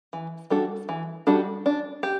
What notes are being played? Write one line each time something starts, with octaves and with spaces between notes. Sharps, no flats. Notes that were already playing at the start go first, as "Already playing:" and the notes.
E3
G3 D4 F#4 A4
E3
G3 D4 F#4 A4
D4
G4